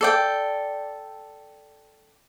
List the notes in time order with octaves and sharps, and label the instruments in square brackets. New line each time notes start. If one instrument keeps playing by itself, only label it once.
[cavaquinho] A4 D5 G5